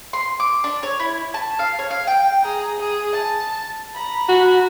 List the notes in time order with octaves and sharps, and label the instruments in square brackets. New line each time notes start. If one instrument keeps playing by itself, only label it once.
[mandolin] C6
D6
D4
C#5
E4
A5
F5
C#5
F5
G5
[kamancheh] G#4 A#5
G#4
A5
A#5 B5
[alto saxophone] F#4